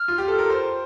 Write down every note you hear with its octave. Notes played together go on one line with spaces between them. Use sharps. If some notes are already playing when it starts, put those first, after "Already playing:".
Already playing: F6
F4
G4
A4
A#4
C5